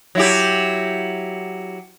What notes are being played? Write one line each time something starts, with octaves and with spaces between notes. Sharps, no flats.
F#3 E4 G4